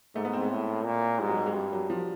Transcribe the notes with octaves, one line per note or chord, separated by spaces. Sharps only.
G#2 A3
B3
C4
G#3
A2
A#2
G#2 G3
F#3
G3
G#3
G2 G3
F#3
F3